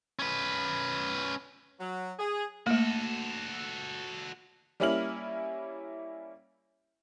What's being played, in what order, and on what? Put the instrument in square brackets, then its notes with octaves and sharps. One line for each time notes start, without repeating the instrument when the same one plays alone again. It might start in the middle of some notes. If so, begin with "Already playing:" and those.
[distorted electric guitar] C#4 B4
[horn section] F#3
G#4
[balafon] A3 A#3 [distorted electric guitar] F#4 A4
[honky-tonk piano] G3 A#3 C#4 E4 F6 F#7